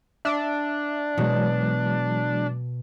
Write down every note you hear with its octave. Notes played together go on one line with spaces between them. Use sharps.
D4 E5
B2 E3 F#3 G#3